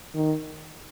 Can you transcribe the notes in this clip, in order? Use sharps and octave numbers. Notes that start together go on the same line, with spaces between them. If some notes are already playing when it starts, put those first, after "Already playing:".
D#3